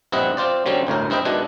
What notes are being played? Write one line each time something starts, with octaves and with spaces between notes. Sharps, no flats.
A#1 G2 C4 E4 D#5 F#5
C4 F4 C5 D5
D3 F#3 G3 C4 C#4
G1 D2 A2 A#4
G2 C4 E4 D#5 G5
B2 D#3 G#3 D4 E4 B4